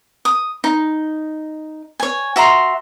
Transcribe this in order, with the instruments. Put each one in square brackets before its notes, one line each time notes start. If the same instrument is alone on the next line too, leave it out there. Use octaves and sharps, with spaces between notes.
[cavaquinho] D#6
D#4
C#5 G#5
F#4 E5 A#5 C6